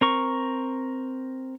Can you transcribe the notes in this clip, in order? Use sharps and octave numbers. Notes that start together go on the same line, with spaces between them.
C4 A#4 C#6